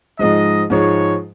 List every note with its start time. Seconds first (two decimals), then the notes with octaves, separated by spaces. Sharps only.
0.19 G#2 F3 G#3 D#5
0.70 G#2 F3 G#3 C#5